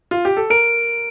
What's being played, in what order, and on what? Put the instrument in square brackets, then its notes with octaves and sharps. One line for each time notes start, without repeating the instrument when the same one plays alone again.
[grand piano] F4
G4
A4
[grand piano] A#4 [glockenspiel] D7